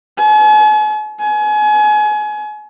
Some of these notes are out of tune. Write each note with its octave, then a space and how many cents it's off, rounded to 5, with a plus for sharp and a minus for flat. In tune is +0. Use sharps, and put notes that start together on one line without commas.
G#5 +45
G#5 +30